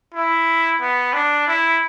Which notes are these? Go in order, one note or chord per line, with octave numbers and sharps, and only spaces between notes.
E4
B3
D4
E4